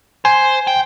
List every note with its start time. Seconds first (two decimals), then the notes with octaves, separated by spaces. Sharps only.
0.25 C5 G#5
0.67 G5